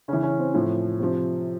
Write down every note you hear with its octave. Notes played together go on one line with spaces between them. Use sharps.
C#3 E3 C#4
C#4
C4
A2 F3
C3 F3